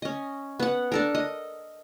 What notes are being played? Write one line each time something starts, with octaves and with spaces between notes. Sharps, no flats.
C#4 D#5
B3 F#5
D4 A4 A#4
D#5